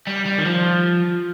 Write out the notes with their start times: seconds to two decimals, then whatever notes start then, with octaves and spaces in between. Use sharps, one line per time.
0.07 G3
0.26 G3
0.38 D#3
0.45 F3